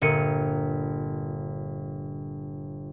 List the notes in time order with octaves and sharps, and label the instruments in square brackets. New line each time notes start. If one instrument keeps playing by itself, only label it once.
[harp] G1 A#2 C#7 D#7